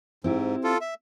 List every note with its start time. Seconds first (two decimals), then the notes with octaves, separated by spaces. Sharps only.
0.24 G#2 C4 E4 G4
0.64 F4 A4
0.81 E5